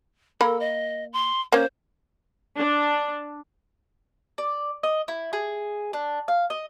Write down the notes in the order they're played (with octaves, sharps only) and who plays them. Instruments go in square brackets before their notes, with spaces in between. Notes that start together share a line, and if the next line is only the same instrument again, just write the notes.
[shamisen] A#3 A#4 B5 [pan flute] A4
[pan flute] D#5
C6
[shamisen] A#3 C#4 [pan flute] C5
[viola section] D4
[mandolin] D5
D#5
E4
G#4
D4
F5
D#5